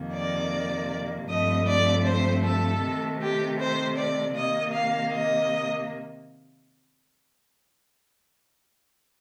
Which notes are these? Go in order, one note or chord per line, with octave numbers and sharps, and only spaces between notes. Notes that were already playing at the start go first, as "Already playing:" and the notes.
Already playing: F2 C3 D#3 A#3
D5
G2 F3 A3 C4 D#5
D5
C5
A4
C3 D#3 A3 C4
G4
C5
D5
C3 D#3 A#3 D#5
F5
D#5